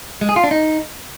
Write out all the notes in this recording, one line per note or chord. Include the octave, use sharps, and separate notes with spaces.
G#3
G#4
F4
D4
D#4